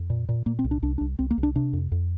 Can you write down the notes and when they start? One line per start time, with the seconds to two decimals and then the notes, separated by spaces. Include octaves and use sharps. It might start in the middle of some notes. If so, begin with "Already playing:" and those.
Already playing: F2
0.10 A#2
0.29 A#2
0.46 A#2 A#3
0.59 C4
0.64 C2
0.71 D4
0.82 C2 D4
0.98 D4
1.01 C2
1.19 C2 C4
1.31 A#3
1.38 C2
1.43 D4
1.55 C3 D4
1.73 F2
1.92 F2